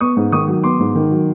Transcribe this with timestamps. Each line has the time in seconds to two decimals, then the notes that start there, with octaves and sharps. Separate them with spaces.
0.01 B3 C#6 D#6
0.17 G#2
0.32 D#3 C#6 D#6
0.48 F#3
0.63 B3 C6 D6
0.79 G#2
0.95 D#3
1.11 F#3